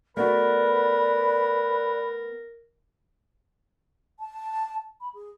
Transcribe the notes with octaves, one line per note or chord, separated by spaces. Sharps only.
A3 B3 F#4 A#4 B4 D5
A5
B5
G#4